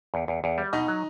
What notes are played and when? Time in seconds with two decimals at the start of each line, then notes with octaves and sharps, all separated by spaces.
0.14 E2
0.28 E2
0.44 E2
0.58 G3
0.73 B2 D#4 D#5
0.88 F#3